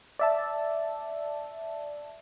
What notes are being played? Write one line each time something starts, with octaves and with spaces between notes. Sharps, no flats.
D5 E5 A5